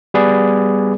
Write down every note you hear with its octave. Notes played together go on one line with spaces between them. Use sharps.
G3 B3 G#4 B4 D5